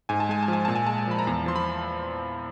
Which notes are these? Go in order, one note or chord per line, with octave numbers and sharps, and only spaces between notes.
G#2 G#5
A5
G#3 G#5
A5
F3 G#5
A#2 A5
G#5
G#3 A5
G#5
F3 B5
A#5
E2 A5
F3 C6
B5